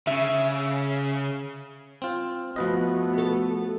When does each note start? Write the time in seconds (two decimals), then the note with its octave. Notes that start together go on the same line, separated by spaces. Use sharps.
0.07 C#3 C#4 E5
2.02 C4 F4
2.56 F3 A3 B3 F#4 B4 D#5
3.18 A4